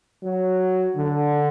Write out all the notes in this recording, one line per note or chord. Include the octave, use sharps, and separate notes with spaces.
F#3
D3